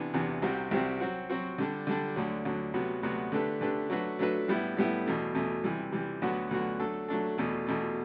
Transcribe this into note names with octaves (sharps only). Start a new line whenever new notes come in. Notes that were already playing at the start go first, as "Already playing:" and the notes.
Already playing: C3 E3 B3 D4
E2 C3 E3 B3 D4
C2 C3 G3 C4 F#4
C2 C3 G3 C4 F#4
F#3 C4 F#4
F#3 C4 F#4
D3 G3 D4
D3 G3 D4
D2 D3 F#3
D2 D3 F#3
D2 C3 F#3 B3 F#4
D2 C3 F#3 B3 F#4
D3 A3 D4 G4 B4
D3 A3 D4 G4 B4
F#3 A3 D4 F#4 B4
F#3 A3 D4 F#4 B4
A2 G3 B3 E4
A2 G3 B3 E4
E2 B2 A3
E2 B2 A3
C3 E3 G3
C3 E3 G3
D2 D3 F#3 B3 F#4
D2 D3 F#3 B3 F#4
F#3 A3 D4 A4
F#3 A3 D4 A4
E2 B2 A3
E2 B2 A3